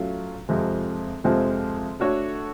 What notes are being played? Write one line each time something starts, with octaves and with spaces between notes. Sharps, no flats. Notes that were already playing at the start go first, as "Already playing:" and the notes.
Already playing: F#3 A3 C#4 F4
F2 C3 F3 G#3
F2 C3 F3 G#3 C4
A3 D4 F#4 A4 C#5